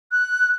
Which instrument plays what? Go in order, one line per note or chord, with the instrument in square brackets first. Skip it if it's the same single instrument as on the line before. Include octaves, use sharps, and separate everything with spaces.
[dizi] F#6